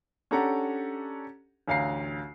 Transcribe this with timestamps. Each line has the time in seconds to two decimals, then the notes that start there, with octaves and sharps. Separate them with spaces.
0.31 C#4 D4 G4 A4 F#5 A#5
1.68 A1 D2 F5 A#5 C7